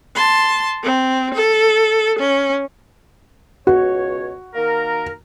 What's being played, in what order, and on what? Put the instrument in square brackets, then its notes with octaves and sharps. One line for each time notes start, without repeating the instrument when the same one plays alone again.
[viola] A5 C6
C4
A4
C#4
[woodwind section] C#2 B2 C#5 [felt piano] F#4
[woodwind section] D#3 A#3 A#4